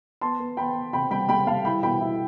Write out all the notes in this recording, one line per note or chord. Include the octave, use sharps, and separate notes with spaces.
B3 A5 C6
B3
B3 G5 B5
B3
C3 G5 B5
G3 G5 B5
G3 G5 B5
G3 F5 A5
E4 G5 B5
B2 G5 B5
E4